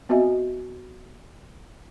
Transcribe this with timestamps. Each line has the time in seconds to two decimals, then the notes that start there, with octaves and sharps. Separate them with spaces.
0.09 B3 C4 F#4 D#5 E5 G#5